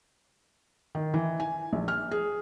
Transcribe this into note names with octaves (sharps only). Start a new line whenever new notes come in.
D#3
E3
G#5
A#1
F6
G#4